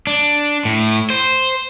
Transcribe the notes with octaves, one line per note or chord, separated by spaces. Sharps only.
D4
A2
C5